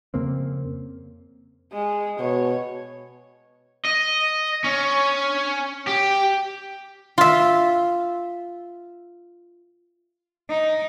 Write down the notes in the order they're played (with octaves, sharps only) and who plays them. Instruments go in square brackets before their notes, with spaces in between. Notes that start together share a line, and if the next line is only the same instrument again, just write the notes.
[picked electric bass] F2 C#3 A#3 C4
[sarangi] G#3
[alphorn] B2 [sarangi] C#5
[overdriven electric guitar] D#5
C#4
G4
[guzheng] F4 E5
[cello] D#4